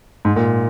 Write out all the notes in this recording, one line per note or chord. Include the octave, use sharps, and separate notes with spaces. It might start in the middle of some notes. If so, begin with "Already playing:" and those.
G#2
A#2